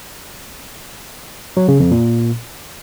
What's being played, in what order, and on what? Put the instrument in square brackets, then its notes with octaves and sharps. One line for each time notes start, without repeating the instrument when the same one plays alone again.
[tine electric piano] F#3
C#3
F2
A#2